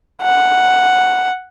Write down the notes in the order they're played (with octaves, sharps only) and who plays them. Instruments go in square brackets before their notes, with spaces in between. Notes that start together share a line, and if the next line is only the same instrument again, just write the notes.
[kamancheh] F#5